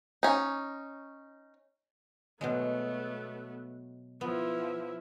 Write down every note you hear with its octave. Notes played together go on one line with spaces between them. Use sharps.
C#4 D#4
B2 F#3 G#3 A3 B3
F3 B3 E4